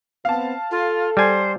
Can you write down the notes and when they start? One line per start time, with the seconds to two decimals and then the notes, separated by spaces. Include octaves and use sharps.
0.25 B3 C4 F5 A5
0.71 F4 A4
1.17 G3 C5 G#5